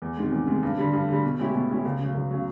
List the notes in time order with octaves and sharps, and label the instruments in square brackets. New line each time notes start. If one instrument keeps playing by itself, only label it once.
[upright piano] E2
C3 D#3 G#3
E2
C3 D#3 G#3
G2
D3 G3
G2
D3 G3
B2
G#3 C#4 E4 G4
B2
G#3 C#4 E4 G4
C#2
C#3
F#3
C#2
C#3 F#3